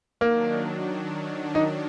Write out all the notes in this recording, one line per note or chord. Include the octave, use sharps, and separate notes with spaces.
D#3 F#3 A#3 D4
D#4